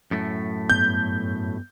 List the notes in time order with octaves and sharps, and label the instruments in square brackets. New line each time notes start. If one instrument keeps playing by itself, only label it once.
[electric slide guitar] F#2 A2 A3
[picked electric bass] G2 B3 [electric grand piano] G6